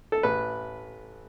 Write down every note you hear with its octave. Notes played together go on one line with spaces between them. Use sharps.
A4
A1 B4